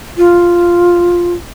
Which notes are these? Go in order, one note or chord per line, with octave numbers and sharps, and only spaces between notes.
F4